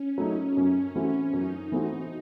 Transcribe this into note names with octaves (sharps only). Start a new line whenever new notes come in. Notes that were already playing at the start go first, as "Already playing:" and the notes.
Already playing: C#4
F#3 A3 D#4
F#2
E3 A3 C4 F#4
F#2 D#4
E3 A3 C4 F#4